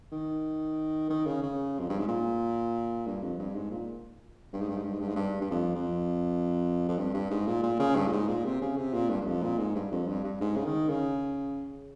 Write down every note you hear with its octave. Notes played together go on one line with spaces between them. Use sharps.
D#3
D#3
C#3
C#3
F2
G2
G#2
A#2
G2
F2
G2
G#2
A#2
G2
G#2
G2
G#2
G2
G#2
G2
G#2
G2
G2
F2
F2
F2
G2
G2
G#2
A#2
A#2
C#3
G2
A#2
G#2
A#2
C3
C#3
C3
A#2
G2
G2
F2
A#2
G#2
G2
F2
G2
G2
G#2
C#3
D#3
C#3